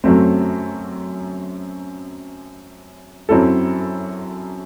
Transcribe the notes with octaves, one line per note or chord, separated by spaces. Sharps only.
F#2 F#3 A3 C4
F#2 F#3 C4 E4 A4